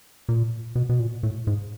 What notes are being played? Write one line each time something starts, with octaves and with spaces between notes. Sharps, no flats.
A#2
B2
B2
A#2
A2
G#2